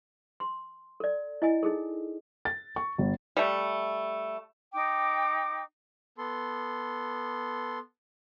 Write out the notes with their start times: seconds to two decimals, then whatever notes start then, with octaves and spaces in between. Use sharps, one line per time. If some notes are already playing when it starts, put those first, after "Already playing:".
0.40 C6
1.00 A4 D5
1.42 E4 D#5 G#5
1.63 D#4 G#4 A4
2.45 A6
2.76 C#6
2.98 G1
3.37 G3 A3
4.73 D#4 G5 D6
6.18 B3 A4 C6